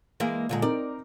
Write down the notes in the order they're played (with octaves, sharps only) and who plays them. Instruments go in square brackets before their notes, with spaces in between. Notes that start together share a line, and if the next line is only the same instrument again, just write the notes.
[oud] E3 G#3 A#3
A#2 D3 G#3
[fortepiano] C4 D#4 A#4 [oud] D5